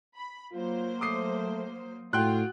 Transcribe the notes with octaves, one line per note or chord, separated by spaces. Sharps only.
B5
F#3 A#3 F4 C5
A3 D6 D#6 C7
A2 F4 F#4 G5 C6 F#6